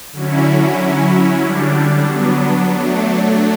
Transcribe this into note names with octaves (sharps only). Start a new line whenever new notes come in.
D3 F#3 C#4 E4
F#3 C#4 E4
D3 G3 D4
F#3 B3 D4
F#3 A3 D4